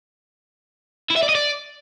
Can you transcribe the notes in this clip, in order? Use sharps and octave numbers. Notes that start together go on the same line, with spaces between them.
E4
E5
D5
D#5
D5